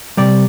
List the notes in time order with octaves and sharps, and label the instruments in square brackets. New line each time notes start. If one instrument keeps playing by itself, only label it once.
[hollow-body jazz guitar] C3 G3 D5